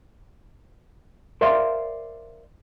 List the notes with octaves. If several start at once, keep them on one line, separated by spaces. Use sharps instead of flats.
A#4 C5 D5 E5 F5 C6